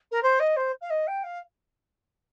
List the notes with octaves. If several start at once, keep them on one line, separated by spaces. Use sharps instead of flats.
A#4
C5
D#5
C5
F5
D#5
G5
F5